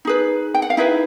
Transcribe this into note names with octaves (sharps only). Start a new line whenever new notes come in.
D#4 G#4 B4
G5
F#5
F5
D#4 E4 G#4 B4 E5